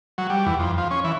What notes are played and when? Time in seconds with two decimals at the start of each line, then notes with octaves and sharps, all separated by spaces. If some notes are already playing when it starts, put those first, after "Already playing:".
0.18 F#3
0.30 G3
0.46 E2
0.60 F2
0.78 F3
0.91 C#4
1.04 E3